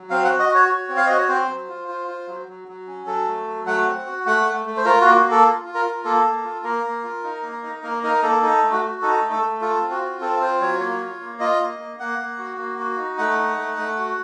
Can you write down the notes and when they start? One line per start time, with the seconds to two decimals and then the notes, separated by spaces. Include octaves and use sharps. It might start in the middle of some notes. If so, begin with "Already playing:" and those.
Already playing: F#3
0.10 C4 F5
0.25 F#4 F#5
0.39 D#5
0.49 F#4
0.54 C#5
0.69 F#4
0.89 C4
0.97 F5
1.07 F#4 D#5
1.18 C#5
1.28 C4 C5
1.49 F#3
1.69 F4
1.88 F4
2.08 F4
2.27 F#3
2.48 F#3
2.68 F#3
2.87 C#4
3.07 F#3 A4
3.28 A3
3.47 F#3
3.66 A3 F#5
3.87 C4
4.06 F#4
4.26 A3 F#5
4.46 A3
4.66 A3
4.77 C5
4.85 F4 A#4
5.01 A#3 F#4
5.15 F#4
5.26 A#3 A4
5.46 F4
5.65 F4
5.74 A#4
5.85 F4
6.05 A#3 A4
6.24 A#3
6.44 F4
6.64 A#3 A#4
6.84 A#3
7.03 F4
7.24 D#4
7.43 A#3
7.63 D#4
7.83 A#3 A#4
8.03 D#4 A#4
8.22 A#3 A4
8.42 D#4 A4
8.62 A3
8.72 F#4
8.82 F#4
9.02 D#4 A4
9.22 A3
9.31 A4
9.42 A3
9.61 F4 A4
9.81 C4
9.91 F#4
10.02 F4
10.21 C4 A4
10.40 F4 C5
10.61 F#3 C#5
10.80 A#3 C#5
11.01 F4
11.20 A#3
11.40 F4 D#5
11.60 A#3
11.79 A#3
11.99 A#3 F#5
12.19 A#3
12.38 F#4
12.58 A#3
12.79 F#4
12.98 D#4
13.18 A3 F#5
13.39 D#4
13.58 A3
13.77 A3
13.98 F#4